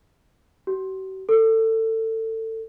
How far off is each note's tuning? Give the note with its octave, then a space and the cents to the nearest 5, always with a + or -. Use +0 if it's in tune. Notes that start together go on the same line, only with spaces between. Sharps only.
F#4 +45
A4 +25